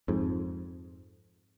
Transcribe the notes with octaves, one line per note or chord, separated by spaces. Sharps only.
F2 G#2